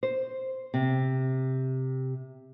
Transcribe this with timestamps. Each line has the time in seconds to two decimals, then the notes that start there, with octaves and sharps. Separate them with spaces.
0.03 C5
0.74 C3